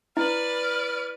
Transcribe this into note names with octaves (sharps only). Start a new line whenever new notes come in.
E4 B4 D5 F6